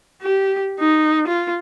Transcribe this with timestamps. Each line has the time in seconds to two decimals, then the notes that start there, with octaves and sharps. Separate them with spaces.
0.22 G4
0.80 D#4
1.28 F4